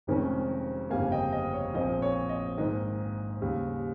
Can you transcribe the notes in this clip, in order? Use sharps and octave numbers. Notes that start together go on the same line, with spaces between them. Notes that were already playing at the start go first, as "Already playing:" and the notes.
F1 F2 D#3 G#3 C#4
G1 F2 C#3 G3 A#3 F5 G#5
G#5
D#5 G5
D#5
C#5
A#1 A#2 F3 C4 D#5
C#5
D#5
G#2 D#3 A#3 D#5
D#2 C#3 G3